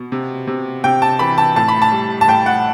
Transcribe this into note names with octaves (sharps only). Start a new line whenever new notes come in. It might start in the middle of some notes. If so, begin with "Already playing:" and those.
Already playing: B2
C3
C3
C3 G5
A5
E3 B5
A5
A2 A5
B5
A5
G3
A5
A2 G5
F#5